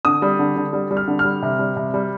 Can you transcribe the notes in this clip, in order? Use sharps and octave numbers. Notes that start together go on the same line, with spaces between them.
D3 D#6
G3
D3
D3
G3
G3
F6
D3
F6
G3
C3
G3
C3
G3